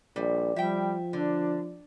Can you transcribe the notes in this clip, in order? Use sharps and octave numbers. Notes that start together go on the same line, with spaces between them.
A#1 G3
F3 G3 E5 G5
D3 D4